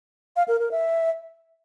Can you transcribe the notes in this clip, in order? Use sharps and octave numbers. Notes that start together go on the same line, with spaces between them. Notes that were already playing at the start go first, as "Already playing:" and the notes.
F5
A#4
A#4
E5